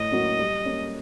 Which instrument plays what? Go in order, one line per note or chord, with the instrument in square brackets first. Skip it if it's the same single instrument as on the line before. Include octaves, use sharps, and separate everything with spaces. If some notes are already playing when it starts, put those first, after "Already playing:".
Already playing: [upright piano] A2 [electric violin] D#5
[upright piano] F#3 A#3 C#4 F#4
G3
A#3 C#4